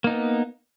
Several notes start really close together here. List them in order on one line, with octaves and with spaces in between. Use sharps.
A#3 D#4 B3